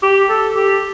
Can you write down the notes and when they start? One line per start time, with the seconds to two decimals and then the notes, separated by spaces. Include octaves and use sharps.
0.03 G4
0.29 A4
0.56 G4